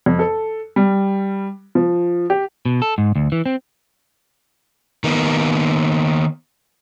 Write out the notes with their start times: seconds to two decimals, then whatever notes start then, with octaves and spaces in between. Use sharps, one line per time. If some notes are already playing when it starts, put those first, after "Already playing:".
0.06 F2
0.19 A4
0.76 G3
1.75 F3
2.30 G4
2.66 B2
2.82 A4
2.98 G#2
3.16 D2
3.32 E3
3.46 C4
5.04 D#3 A#3 B3